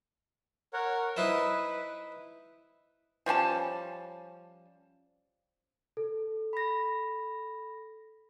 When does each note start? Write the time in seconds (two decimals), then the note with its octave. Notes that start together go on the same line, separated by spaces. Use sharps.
0.73 A#4 C#5 F#5
1.17 D#4 E4 B4 C5
3.26 F3 G3 C#4 A5
5.97 A4
6.53 B5 A#6